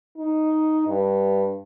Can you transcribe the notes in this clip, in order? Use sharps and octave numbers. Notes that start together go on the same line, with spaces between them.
D#4
G2